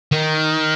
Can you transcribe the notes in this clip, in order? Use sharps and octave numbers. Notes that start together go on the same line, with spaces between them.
D#3